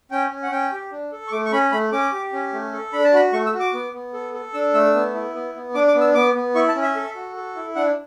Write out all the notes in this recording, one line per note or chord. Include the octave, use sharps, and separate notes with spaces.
C#4 G5
C#4
F#5
C#4 G5
G4
D4
A4
C#6
A3 D6
C#6
C#4 B5
A3 B5
C#4 D6
G4
C#4
A3
A4
D4 B5
A5
F#4 B5
A3 C#6
E6
F#4
D6
B3
B3
A4
A4
D4 E6
A3 E6
B3
E4
B3
B3
D4 D6
D6
B3
E6
B3 D6
B3
E4 C#6
A5
C#4
E5
A4
F#4
A4
E4
D4 F#5